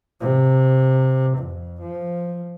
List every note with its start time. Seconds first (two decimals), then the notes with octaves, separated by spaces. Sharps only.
0.21 C3
1.38 F2
1.81 F3